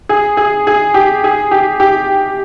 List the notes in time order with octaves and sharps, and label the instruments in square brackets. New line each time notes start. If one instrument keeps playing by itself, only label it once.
[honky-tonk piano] G#4
G#4
G#4
G4
G#4
G4
G4